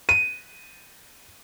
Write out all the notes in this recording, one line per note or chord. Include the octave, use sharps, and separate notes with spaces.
D#7